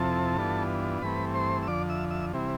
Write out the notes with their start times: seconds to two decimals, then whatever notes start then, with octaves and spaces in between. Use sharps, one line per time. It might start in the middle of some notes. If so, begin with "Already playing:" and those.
Already playing: F2 C3 F3 C4 E4 A4 A5
0.37 G2 E3 B3 D4 F4
1.02 G2 E3 A3 C4 B4 B5
1.34 C5 C6
1.63 E6
1.67 F2 D3 F3 D5 D6
1.89 E5 E6
2.10 E5 E6
2.33 C3 E3 G3 C4 E4